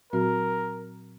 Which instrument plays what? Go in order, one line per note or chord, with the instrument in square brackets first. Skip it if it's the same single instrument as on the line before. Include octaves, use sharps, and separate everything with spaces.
[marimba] A#2 F#3 C4 F#4 [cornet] A#4